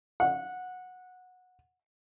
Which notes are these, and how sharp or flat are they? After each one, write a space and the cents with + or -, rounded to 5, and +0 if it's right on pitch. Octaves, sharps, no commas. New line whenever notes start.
F#5 -15